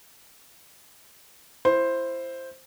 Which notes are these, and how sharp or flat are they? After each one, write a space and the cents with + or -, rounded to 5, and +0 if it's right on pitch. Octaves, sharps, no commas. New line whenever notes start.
E4 +20 C5 +5